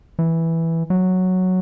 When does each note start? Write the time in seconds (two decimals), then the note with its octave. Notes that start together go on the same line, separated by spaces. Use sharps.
0.19 E3
0.90 F#3